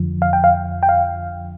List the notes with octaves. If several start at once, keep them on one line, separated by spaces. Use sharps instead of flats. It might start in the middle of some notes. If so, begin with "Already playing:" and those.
Already playing: F2 D3 F3
F5
G5
F5
G5
F5